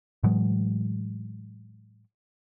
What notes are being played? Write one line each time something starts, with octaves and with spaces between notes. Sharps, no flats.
A2 E3 F#3 G#3